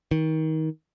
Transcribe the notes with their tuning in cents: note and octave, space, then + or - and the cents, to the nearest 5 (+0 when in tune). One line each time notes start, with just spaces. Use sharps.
D#3 +25